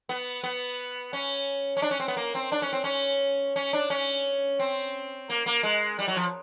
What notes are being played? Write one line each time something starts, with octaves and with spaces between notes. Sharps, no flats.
B3
B3
C#4
C#4
D4
C#4
C4
B3
A#3
C4
D4
C#4
C4
C#4
C#4
D4
C#4
C4
A#3
A#3
G#3
G3
F#3
F3